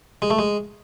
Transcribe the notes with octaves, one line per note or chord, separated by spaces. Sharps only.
G#3
A3
G#3